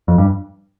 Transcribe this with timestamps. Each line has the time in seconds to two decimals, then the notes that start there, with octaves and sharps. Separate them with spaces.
0.08 F2
0.18 G2